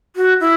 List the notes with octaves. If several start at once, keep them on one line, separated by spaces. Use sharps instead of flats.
F#4
E4